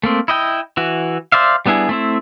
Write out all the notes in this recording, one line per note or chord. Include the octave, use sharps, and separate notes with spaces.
A3 A#3 C4
E4 D#5 G5
E3 F#4
C5 D5 E5 F5
G3 B3 D4 E4 G#4
A3 C4 E4